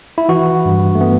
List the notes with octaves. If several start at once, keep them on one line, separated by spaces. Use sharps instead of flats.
E4
E3 F#4
G2
A3
B3